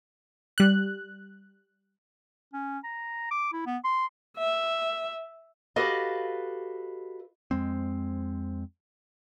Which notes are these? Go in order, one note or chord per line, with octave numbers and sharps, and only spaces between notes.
G3 F#6
C#4
A#5
D6
E4
B3
C6
E5
F#4 G4 A4 B4 D#5 F5
F2 G#3 C4